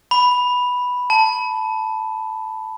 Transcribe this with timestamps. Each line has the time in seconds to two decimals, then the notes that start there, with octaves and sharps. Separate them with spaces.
0.11 B5
1.10 A5